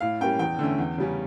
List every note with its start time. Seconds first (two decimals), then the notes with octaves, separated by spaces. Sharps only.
0.01 A2 F5
0.21 G3 A#3 C#4 G5
0.39 E2 G5
0.59 D3 A3 C#4
0.78 E2
0.98 C#3 G3 C#4